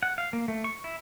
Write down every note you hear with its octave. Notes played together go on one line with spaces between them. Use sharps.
F#5
F5
A#3
A3
C#6
E4